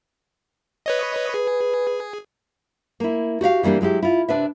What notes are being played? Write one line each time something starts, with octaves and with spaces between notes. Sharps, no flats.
B4 C#5 D#5
G#4 B4
A#3 E4
F#4 G4 E5 F5
E3 G3 A#3 D4 G4
F#3 G#3 E4 G4
E4 F4
C3 D4 B4 E5